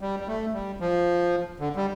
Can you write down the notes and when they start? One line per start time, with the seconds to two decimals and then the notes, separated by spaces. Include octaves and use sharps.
0.01 G3
0.20 G3
0.27 A3
0.53 G3
0.80 F3
1.59 D3
1.76 G3